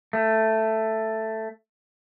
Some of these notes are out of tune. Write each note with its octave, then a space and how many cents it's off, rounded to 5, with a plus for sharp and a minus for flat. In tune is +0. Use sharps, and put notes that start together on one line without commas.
A3 +5